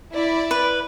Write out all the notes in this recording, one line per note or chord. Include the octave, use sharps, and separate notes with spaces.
E4 D5
B4